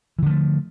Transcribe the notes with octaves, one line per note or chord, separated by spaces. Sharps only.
D3 E3 F3 A3